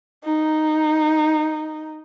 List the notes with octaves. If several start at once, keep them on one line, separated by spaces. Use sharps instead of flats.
D#4